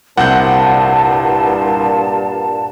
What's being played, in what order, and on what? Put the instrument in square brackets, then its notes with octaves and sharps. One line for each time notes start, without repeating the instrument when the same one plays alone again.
[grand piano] C2 C4 G6 [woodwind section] G2 A#2 [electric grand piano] F#5 [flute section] A5